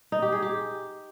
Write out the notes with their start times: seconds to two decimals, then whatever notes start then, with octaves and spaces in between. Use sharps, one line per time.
0.12 D#4
0.22 G4
0.32 G#4
0.42 G4